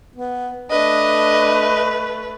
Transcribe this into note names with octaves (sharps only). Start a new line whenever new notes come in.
B3
A3 D4 B4 D#5